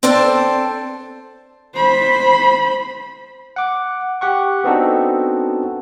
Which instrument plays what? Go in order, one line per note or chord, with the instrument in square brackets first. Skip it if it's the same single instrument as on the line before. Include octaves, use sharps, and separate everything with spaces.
[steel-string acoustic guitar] C4 D4 A4 C5 A5
[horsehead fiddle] C5 B5
[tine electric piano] F#5 D6
G4 F#5 C#6
B3 C4 D4 D#4 F#4 A4